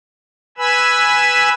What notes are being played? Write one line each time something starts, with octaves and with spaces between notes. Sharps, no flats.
B4 G#5 B5 E6